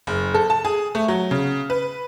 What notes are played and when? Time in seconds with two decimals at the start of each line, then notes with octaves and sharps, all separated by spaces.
0.07 F#1
0.34 A4
0.50 A5
0.65 G#4
0.95 A3
1.08 F#3
1.31 C#3
1.70 B4